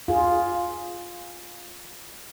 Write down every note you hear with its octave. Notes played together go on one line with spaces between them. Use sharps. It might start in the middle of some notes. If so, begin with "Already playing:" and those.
F4 G#4